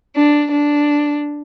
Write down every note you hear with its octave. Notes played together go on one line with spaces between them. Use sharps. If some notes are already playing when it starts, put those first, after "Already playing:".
D4
D4